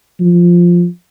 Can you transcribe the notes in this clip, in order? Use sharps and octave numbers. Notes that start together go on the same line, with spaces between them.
F3